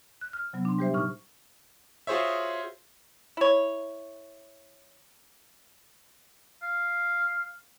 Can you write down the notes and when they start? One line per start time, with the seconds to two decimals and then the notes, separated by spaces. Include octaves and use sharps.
0.21 F#6
0.33 F6
0.53 C3 F#3 B3
0.65 D4 C6
0.79 G3 G4 C5 E5
0.94 A#2 D#4 C#6 F6
2.07 F4 F#4 G#4 C5 C#5 E5
3.37 E4 C#5
6.63 F5